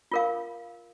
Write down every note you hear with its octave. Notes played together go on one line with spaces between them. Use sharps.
F4 A#4 F5